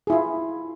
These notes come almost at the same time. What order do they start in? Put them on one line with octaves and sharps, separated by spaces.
G#4 E4 F4